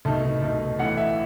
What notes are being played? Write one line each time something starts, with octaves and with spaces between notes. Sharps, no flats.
C2 B2 A3 D#4 A5
C2 B2 A3 D#4
A1 A2 E3 F#5
E5